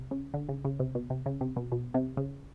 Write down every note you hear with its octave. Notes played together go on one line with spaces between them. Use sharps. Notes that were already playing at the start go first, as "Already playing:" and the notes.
Already playing: C3
C#3
D3
C#3
C#3
C3
B2
C3
C#3
C3
B2
B2
C3
C#3